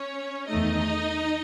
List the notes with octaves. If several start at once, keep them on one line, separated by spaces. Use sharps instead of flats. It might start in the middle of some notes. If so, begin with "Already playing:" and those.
Already playing: C#4 C#5
E2 D#3 A3 D#4 D#5